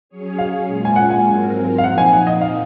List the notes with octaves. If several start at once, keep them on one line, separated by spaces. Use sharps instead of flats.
F#3 C#4 G#4 C#5
F5
A#2 G#3 C#4 F4
G#5
F#5
G#5
G#2 F#3 C4 F4 A#4
F5
A#2 F3 C4 D#4 F#5
G#5
F#5
D#5
F5